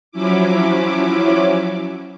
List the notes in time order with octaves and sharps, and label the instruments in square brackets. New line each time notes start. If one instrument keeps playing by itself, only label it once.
[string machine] F3 F#3 C#4 E4 D6